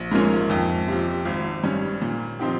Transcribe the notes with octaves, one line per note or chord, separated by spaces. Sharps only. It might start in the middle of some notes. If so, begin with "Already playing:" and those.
Already playing: A#1
G#2 F3 A#3 C#4
F2
C3 F3
G#1
G2 G3 C#4
A#2
F3 C4 D#4 G4